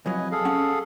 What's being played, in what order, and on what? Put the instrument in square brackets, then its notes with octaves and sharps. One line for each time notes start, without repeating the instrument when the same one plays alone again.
[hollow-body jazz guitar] C2 F2 F#3 [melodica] B4 D#5 G#5
[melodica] G#4 A4 F5
[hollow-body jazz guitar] C#4 F#5